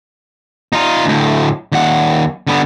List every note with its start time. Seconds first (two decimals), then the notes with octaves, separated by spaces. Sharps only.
0.73 D#4 F4
1.06 D2 A2
1.72 D#2 F#5
2.47 D3 B3